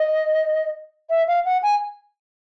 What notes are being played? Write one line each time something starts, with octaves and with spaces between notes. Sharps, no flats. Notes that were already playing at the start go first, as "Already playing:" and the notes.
Already playing: D#5
E5
F5
F#5
G#5